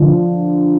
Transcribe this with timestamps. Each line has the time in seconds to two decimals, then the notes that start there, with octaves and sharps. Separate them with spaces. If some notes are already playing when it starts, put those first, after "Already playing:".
Already playing: D3 F3